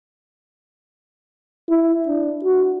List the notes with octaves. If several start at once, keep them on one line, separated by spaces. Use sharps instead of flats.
E4
D4
F#4